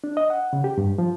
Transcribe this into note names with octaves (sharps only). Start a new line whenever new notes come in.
D4
D#5
F#5
C#3
G4
G2
F3